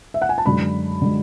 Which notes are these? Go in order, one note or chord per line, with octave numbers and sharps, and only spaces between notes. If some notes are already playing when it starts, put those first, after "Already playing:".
E5
F#5
G#5
A5
F#2 D3 G#3 B5
D3 G#3